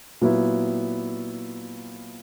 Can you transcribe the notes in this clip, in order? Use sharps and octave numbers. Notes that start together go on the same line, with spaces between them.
A#2 F#3 B3 E4